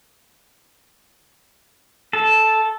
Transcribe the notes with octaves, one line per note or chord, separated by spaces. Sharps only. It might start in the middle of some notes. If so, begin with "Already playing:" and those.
A4